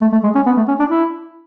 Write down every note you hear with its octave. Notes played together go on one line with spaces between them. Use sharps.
A3
A3
G#3
C#4
B3
A3
C#4
D4
E4